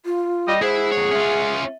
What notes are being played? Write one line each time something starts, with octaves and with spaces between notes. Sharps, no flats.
F4
G3 D#5
G#3 E4 F#4 G#4 C5
F2 C#5
C#4 F4 E5